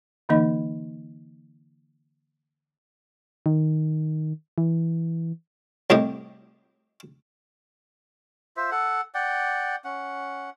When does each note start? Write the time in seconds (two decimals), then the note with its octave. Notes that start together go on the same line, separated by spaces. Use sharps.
0.29 D3 E3 A#3 D#4 D#5 B5
3.46 D#3
4.58 E3
5.90 C2 A2 G4 D#5
8.57 F4 C5 E5
8.71 A4 F#5
9.14 D5 F#5 G5
9.85 C#4 F#5